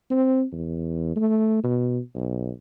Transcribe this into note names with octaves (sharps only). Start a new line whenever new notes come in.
C4
E2
A3
B2
B1